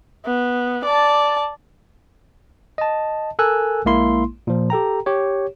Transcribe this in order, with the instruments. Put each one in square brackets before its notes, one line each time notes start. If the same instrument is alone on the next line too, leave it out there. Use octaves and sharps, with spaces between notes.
[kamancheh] B3
D5 A5
[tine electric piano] D#5 A5
A4 A#4 G#5 E6 F#6
A#1 G#3 A#3 E4 C6
A#2 F3
G4 A4 G5 A#5
G4 C#5